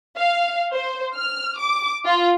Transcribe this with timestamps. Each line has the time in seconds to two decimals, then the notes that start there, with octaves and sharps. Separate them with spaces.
0.18 F5
0.73 C5
1.15 F6
1.60 D6
2.06 F4